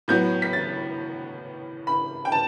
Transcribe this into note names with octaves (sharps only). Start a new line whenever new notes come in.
A2 F#3 B3 G6
B6
A6
B5
G5
A5